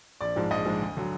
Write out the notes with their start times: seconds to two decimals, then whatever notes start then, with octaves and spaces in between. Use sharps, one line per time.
0.21 A#1 D5
0.36 G#2 F3 G#3
0.51 A#1 D#5
0.65 G#2 F3 G#3
0.81 D2
0.96 D3 F#3